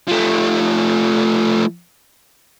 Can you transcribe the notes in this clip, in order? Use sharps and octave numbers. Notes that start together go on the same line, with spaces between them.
F3 A3